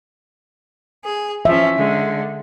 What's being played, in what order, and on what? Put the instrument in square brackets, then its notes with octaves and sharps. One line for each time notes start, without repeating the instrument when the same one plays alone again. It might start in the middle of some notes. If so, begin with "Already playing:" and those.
[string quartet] G#4
[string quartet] E3 F3 C#4 [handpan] E5
[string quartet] D3 G#3